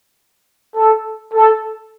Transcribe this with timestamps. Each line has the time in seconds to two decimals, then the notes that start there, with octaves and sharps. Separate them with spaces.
0.76 A4
1.34 A4